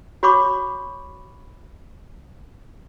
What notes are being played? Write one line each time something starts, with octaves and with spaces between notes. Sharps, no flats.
F#4 C#5 B5 C#6 D6